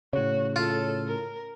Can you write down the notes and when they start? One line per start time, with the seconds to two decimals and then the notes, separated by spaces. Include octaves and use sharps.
0.13 A2 C#3 F#4 C#5
0.56 F4 A4
1.07 A#4